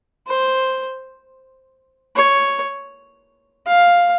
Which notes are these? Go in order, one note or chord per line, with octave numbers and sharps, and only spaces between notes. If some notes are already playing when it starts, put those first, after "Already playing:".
C5
C#5
F5